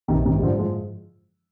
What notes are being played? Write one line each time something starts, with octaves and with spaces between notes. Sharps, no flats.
A#1 C3 D#3
G#2 C3 D#3
G3
G#2 D3 F3
F3 G#3